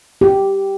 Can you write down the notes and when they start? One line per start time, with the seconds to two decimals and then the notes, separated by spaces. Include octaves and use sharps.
0.21 G4